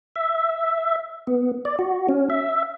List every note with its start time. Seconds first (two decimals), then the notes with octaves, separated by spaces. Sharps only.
0.16 E5
1.27 B3
1.65 D5
1.79 F#4
2.09 C#4
2.30 E5